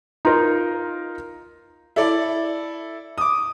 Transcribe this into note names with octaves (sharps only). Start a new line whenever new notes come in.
D#4 F4 A#4
E4 A4 D5
D6 D#6